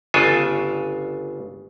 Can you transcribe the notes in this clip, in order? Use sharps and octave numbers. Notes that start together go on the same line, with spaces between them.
G1 C#3 D4 F4 A4 G#5